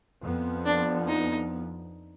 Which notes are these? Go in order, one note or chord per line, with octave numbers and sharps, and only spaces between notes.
F2 F3 B3
D4
D#4